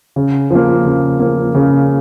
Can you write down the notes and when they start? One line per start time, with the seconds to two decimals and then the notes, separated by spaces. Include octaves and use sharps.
0.16 C#3
0.51 F3 A#3
0.85 C#3
1.20 F3 A#3
1.55 C#3